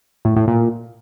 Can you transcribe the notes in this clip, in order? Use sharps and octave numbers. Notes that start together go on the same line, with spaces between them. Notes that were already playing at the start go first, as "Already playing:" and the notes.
A2
A2
A#2